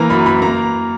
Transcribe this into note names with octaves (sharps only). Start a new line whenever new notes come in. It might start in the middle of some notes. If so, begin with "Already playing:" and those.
Already playing: E3 A#3 A#5
F#2 B5
E3 B5
A#3 A#5